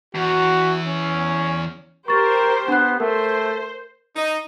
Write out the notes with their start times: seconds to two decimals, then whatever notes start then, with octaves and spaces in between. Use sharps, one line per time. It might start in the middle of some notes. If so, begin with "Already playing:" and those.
0.15 E2 F#4
0.87 C#4
2.08 G4 A#4 C5 C#6 A6
2.68 B3 D4 F#6
3.00 A3 A#4 C5
4.16 D#4